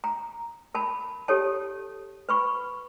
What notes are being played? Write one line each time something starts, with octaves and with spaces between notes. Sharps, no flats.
A#5
A#4 A5 B5
G4 A4 C#5 A5
B4 B5 C#6